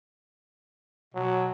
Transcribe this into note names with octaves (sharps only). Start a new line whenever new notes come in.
B2 F#3